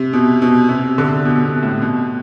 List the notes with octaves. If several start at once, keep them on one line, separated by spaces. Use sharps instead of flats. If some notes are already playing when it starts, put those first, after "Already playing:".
Already playing: C3
B2
B2
C3
D3
B2
B2
A2
B2